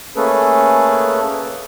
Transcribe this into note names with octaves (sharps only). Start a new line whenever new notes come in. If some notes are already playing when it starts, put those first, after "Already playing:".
A3 A#3 C#4 G#4 A4 B4